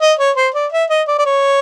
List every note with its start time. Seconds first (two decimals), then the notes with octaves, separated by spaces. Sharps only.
0.01 D#5
0.19 C#5
0.36 C5
0.54 D5
0.72 E5
0.90 D#5
1.08 D5
1.18 D5
1.25 C#5